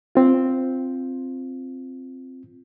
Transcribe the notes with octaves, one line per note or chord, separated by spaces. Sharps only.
C4 F4